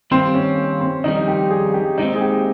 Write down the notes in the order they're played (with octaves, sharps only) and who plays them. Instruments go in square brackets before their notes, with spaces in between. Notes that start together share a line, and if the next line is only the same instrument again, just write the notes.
[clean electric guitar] D#2 D#3 G3 [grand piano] C4
[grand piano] C#4
C4
[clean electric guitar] F2 D#3 G3 [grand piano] D#4
[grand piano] G4
G#4
G4
[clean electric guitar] D#2 D#3 G#3 C4 [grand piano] D#4
[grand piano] G#4
G4